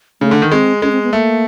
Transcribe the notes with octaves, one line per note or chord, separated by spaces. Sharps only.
C#3 A3
D3
D#3
G#3 C4
G#3 C#4
C4
B3
A3 A#3